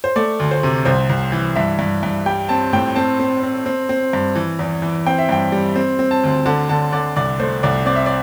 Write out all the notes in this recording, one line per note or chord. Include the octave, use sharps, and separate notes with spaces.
C5
A3 D5
D2
C5
C3
C2 C5
C2
E3
G2 E5
G2
G2
G3 G5
C4 A5
A2 G5
C4 A5
C4
C4
C4
C4
G2
E3
E2
E3
C4 G5
E5
G2 G5
G3
C4
C4
A5
D2
D3 A5
D3 A5
D3 D5
C2 D5
A3 C5
C2 D5
C4 D5
E5
D5